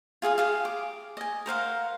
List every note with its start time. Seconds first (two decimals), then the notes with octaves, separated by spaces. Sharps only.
0.22 F4 G#4 F5 D#6
0.38 G4 G#4 F5
0.65 D6
1.17 D#5 G#5
1.46 A#4 C5 F5 F#5